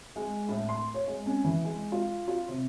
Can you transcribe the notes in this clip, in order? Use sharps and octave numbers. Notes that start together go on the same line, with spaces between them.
G#3
A2
C6
C#5
G#3
C#4
E3
G#3
F4
F4
C3